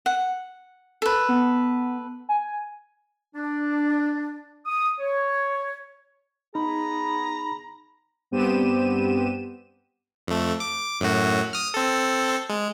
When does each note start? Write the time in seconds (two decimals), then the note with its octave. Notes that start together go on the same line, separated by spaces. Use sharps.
0.06 F#5
1.02 A4 B4
1.29 B3
2.29 G#5
3.35 D4
4.66 D#6
5.00 C#5
6.55 B3 D#4 G#4 A#5 B5
8.31 G2 B3 C4 G4 D#7 E7
10.27 F2 A3
10.60 D6
11.00 F#2 A2 F#4
11.53 D#6 F6
11.74 C4 A4
12.49 G#3